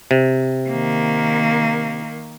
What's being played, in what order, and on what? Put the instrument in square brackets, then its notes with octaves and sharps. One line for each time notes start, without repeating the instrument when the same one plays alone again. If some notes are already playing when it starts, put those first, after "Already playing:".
[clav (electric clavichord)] C3
[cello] D#3 A#3